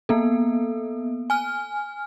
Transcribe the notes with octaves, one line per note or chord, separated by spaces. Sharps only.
A#3 B3 A4
G#5 F6